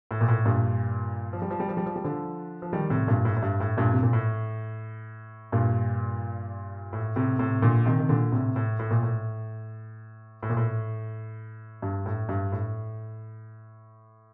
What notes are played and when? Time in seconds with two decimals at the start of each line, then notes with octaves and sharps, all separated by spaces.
0.11 A2
0.21 A#2
0.28 A2
0.45 G2 A#2
1.33 F3
1.42 G3
1.50 F3
1.60 G3
1.69 F3
1.77 G3
1.86 F3
1.96 G3
2.04 D3 F3
2.62 F3
2.73 D#3 G3
2.90 A2 C3
3.08 G2 A#2
3.25 A2
3.37 A2
3.42 G2
3.60 A2
3.77 G2 A#2
3.92 C3
4.03 A#2
4.13 A2
5.52 G2 A#2
6.93 A2
7.16 A2 C3
7.39 A2 C3
7.62 A#2 D3
7.86 C3 D#3
8.00 D#3
8.09 A#2 D3
8.32 A2 C3
8.56 A2
8.79 A2
8.91 A#2
9.03 A2
10.43 A2
10.50 A#2
10.57 A2
11.82 G2
12.06 A2
12.29 G2
12.52 A2